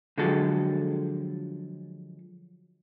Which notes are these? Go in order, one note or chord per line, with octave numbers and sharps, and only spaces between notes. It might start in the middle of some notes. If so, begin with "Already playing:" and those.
D3 F3 F#3 G#3 A4